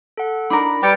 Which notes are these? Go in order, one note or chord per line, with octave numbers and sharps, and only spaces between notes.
A4 F#5
D4 D#4 A#4 B5
G3 B4 G5 D6 A6 C#7